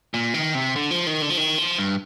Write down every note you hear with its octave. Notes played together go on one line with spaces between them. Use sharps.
A#2
D#3
C3
D3
F3
D#3
D3
F3
D#3
F3
G2